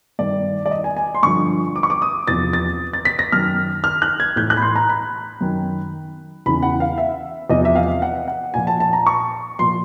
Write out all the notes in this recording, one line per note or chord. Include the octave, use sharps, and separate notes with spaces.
G2 D#3 D5
D5
D#5
G#5
G#5
C6
G2 D3 F3 C#6
D6
C#6
D6
D#6
E2 C3 F3 A6
A6
A6
B6
A#6
F#2 D#3 F6
F6
F#6
G#6
A2 E3 G6
F#6
B5
C6
A#5
B5
F#2 D#3
E2 C#3 E3 B5
F#5
F5
E5
E2 C3 F3 D#5
E5
F5
F#5
F#5
A#2 F3 G#5
A5
A5
A#5
C#6
A#2 F3 C6